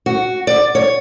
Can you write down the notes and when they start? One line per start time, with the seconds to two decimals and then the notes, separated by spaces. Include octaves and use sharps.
0.06 F#4
0.47 D5
0.75 C#5